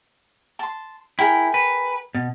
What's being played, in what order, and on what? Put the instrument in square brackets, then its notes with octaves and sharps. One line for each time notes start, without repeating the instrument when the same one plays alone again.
[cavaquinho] A5 C6
[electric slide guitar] E4 [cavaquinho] G#4 A#4 G5
[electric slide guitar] B4
B2